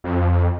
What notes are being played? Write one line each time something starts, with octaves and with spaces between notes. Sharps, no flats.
F2